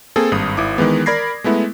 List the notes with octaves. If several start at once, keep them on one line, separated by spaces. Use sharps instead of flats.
A#3 C4 G#4 A4
G#1 G2 D#6
G#1 E4 D6
D#3 E3 G#3 B3
A#4 D5 B5 G#6 A#6 C7
G#3 A3 B3 E4